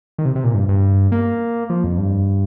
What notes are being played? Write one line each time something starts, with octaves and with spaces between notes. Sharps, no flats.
D#3
C3
C3
A#2
G2
G2
A#3
F3
F2
G2